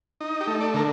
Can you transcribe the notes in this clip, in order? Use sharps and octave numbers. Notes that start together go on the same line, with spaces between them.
D#4
G4
A3
D5
D3 A#4